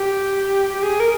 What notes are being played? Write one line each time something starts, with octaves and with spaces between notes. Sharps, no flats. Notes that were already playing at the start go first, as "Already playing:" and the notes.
Already playing: G4
G4
G#4
A#4